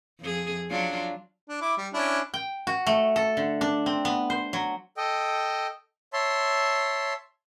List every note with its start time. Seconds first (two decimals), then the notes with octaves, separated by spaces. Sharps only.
0.21 F2 G#4
0.70 F#3 D4 F4
1.49 D4
1.61 E4 D6
1.78 G3
1.94 C#4 D4 E4
2.34 G5
2.67 F#4
2.87 A3
3.16 A4
3.37 D3
3.61 D4
3.86 C4
4.05 B3
4.30 C5
4.53 F#3
4.97 A4 D#5 G5
6.13 C#5 E5 A5 C6